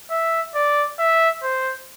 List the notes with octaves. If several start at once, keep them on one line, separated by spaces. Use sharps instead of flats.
E5
D5
E5
C5